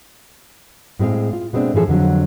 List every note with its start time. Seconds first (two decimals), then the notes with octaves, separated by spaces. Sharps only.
0.99 A2 G#3 C4 G#4 F5
1.33 F4
1.53 B2 G#3 A3 C4 D4
1.74 A2 E3 F3 G#4 A4
1.88 F2 D3 E3 F#3